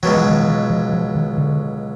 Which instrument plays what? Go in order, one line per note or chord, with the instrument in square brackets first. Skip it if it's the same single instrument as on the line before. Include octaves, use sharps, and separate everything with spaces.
[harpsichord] C#2 B2 F#3 [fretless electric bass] F3
[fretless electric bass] E3
D#3
E3
F3
F3
D#3
D3